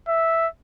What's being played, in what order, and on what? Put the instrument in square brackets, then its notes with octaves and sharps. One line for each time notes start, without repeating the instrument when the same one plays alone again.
[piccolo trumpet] E5